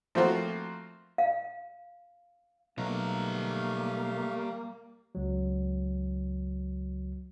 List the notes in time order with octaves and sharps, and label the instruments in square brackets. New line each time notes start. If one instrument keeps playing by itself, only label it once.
[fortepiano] F3 A3 A#3 C4 F4 F#4
[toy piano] F5
[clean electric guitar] B1 [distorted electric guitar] G3 A#5 [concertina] A3 F5 [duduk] A#3
[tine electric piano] C#2 F#3